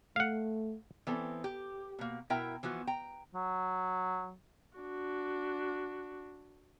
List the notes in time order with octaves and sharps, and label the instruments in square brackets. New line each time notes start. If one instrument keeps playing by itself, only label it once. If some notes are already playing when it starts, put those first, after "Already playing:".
[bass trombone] A3 [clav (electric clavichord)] F5 F#5
[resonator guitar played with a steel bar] E3 B3 C4 A4
G4
B2 A#3
B2 E4 A#4 E5 G5 A#5
E3 F3 B3 F#4
G5 A#5
[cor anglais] F#3
[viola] D4 F#4